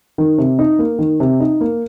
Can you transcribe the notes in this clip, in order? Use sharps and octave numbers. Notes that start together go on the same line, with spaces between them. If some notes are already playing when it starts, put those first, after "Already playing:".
D#3
C3
D#4
A#3
D#3
C3
D#4
A#3